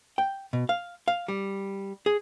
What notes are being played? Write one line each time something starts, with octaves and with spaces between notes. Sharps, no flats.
G5
B2
F5
F5
G3
G#4